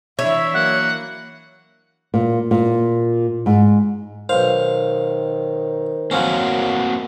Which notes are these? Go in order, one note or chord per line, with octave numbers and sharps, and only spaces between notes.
E3 D4 E4 C#5 E5
F#3 A#3 F#5
A#2
A#2
G#2
B1 D#3 C5 F5
F3 F#3 A#3 C4 C#4 F#4